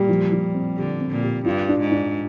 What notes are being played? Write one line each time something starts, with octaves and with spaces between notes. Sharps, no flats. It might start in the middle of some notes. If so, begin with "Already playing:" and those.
Already playing: A#2 G3
F3
F3
C4
D3 G4
C4
A#2
G4
G2 F4
D4
G#2
D4